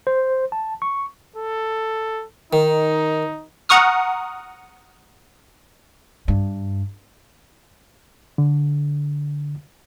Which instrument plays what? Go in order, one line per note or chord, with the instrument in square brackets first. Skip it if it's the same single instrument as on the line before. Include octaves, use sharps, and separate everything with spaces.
[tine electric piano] C5
A5
C#6
[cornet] A4
[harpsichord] D#3 [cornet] D#4
[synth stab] F#5 A#5 C#6 D#6 F6
[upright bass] G2
[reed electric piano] D3